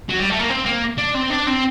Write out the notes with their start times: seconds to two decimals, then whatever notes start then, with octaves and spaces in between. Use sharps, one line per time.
0.09 F#3
0.19 G3
0.30 A3
0.39 A#3
0.49 C4
0.65 A#3
0.98 D4
1.14 C4
1.30 D4
1.47 C4